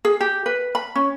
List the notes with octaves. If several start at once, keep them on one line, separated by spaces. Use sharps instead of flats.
G#4
G4
B4
B5
C#4